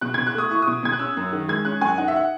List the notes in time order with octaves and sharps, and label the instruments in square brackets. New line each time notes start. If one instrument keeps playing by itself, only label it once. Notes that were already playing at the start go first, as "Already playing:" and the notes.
[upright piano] B2 F#6
B2 G#6
F#6
A3 D#6
E4 C#6
B2 D#6
B2 G#6
F#6
C#4 E6
F#2
D#3
G#3 G#6
C#4 F#6
F#2 G#5
D#4 F#5
E5
F#5